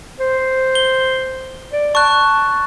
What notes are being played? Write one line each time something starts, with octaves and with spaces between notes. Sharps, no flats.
C5
G7
D5
A5 C#6 F#6